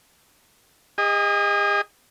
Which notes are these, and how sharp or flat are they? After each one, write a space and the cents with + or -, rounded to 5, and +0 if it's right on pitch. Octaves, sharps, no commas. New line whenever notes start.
G#4 -45 D#5 +0